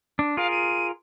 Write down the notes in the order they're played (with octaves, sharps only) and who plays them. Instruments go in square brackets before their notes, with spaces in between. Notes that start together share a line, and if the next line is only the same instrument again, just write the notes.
[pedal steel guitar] D4
[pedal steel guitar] F4 G#4 A#4 [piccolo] F5
[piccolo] D#7